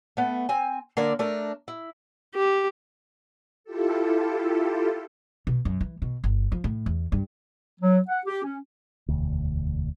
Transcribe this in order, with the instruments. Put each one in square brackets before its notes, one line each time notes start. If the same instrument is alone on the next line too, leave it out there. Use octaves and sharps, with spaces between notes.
[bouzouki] A3 B3
C4 G#5
D3 A#3 A#4 D5
A3 D4 A#4
E4
[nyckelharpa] G4
[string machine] E4 F4 G4 A4
[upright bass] B2
F#2
E3
B2
G1
F3
A2
E2
G2
[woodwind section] F#3
F#5
G4
C#4
[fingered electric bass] E1 D2